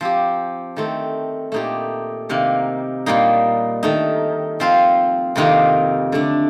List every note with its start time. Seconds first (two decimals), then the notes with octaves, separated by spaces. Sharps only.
0.01 F3 C4 G4
0.77 D#3 A3 C4
1.52 A#2 A3 D#4 G4
2.29 C3 D#3 A#3
3.06 A#2 G3 A#3 D#4
3.83 D#3 A3 D#4
4.60 F3 C4 F4
5.36 F2 C3 D#3 A#3 F4
6.12 D3 A3 D4